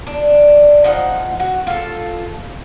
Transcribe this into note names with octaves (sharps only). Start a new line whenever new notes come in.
D4
F3 D#4 F#5
F#4
F4 A4